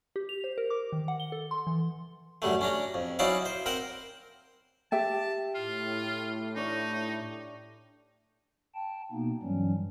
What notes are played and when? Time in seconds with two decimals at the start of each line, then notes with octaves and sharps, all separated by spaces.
0.16 G4
0.29 F7
0.44 C5
0.58 A#4
0.70 D6
0.92 D#3
1.08 F#5
1.20 G7
1.32 A4
1.51 C6
1.67 E3
2.42 F#2 D3 G3 A3
2.61 C#4 D4 A#5
2.94 F2
3.19 F#3 C#4 D#4 E4 D5 F5
3.45 C5
3.66 C4 A#4 C5 F#5
4.92 G4 E5 G5 A5
5.55 A2 F4
6.56 D4 D#4 C#5
8.75 G5 A5
9.12 B2 A#3 B3 D#4
9.42 G2 E3 F#3 G3 C#4